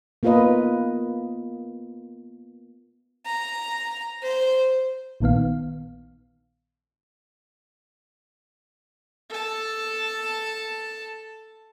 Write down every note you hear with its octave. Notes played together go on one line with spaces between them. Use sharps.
A#3 B3 F4 A#4 B4 D#5
A#5
C5
A#1 A#2 D#3 B3 F5
A4 A5